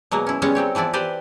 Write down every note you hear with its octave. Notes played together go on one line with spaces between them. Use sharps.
B2 F#3 G#3 A#3
C#4 E4
C#3 G3 G#3 B3 C#4
F#3 C4 G4 C#5
E3 F3 B3 E4 D5
G4 B4 C5 D5 G5